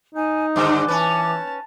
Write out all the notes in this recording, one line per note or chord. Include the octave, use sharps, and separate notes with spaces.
D#4 G#5
G2 D3 D#3 G#5 D6
E3 C#4 B4 A5